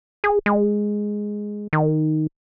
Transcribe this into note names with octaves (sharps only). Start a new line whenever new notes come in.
G#4
G#3
D#3